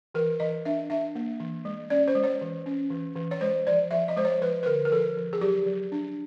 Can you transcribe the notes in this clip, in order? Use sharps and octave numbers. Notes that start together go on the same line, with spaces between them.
E3 A#4
E3 D#5
D4 E5
D4 E5
A#3
E3
G#3
C#4 D5
C5
G#3
C#5
E3
C#4
E3
E3
C#5
G#3 C5
F3 D5
F3 E5
D#5
G#3 C5
C#5
F3 B4
B4
D3 A#4
A#4
F3 A4
F3
G#4
F#3 G4
F#3
D4